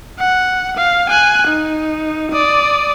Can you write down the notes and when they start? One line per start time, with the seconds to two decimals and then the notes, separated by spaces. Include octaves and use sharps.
0.19 F#5
0.77 F5
1.10 G#5 F#6
1.47 D#4
2.32 D5 D#6